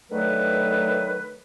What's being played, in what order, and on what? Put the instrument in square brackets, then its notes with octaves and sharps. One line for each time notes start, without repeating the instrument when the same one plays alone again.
[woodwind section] D3 D#3 F#3 A3 B4